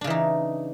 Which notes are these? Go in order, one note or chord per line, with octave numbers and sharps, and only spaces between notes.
C#3 E3 D4 D#4